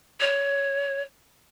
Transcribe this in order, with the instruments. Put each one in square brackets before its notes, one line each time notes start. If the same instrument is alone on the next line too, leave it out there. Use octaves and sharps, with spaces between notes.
[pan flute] C#5